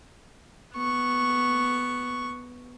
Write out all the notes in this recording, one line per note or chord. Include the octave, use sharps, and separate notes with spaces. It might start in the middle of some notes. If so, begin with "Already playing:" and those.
B3 C#6